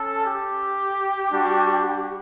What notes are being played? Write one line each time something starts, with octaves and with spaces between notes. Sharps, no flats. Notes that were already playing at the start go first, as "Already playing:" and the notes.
Already playing: C#4 A4
G4
G3 D4 F#4